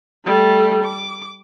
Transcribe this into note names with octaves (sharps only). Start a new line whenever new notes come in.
G3 A3
D6